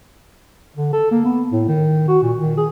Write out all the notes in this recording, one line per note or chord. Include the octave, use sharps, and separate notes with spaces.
D3
A4
A#3
B3
A2
D#3
F#4
A#2
D#3
G#4